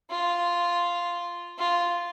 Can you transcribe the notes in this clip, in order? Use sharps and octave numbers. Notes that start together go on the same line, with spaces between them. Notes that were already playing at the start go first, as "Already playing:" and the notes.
F4
F4